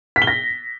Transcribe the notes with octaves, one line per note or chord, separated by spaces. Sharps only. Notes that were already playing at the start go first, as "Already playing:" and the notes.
B6
G7
A#6